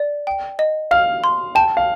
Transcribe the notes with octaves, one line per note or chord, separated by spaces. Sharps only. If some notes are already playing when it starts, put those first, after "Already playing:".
Already playing: D5
G5
D#5
F5 F6
C6
G5 A5
F5